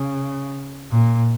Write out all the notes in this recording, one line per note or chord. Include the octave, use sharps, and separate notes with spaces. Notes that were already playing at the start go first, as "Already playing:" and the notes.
Already playing: C#3
A#2